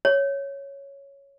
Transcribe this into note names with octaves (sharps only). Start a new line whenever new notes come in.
C#5